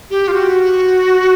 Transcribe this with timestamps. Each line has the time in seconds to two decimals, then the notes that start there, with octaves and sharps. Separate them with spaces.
0.10 G4
0.28 F4
0.33 F#4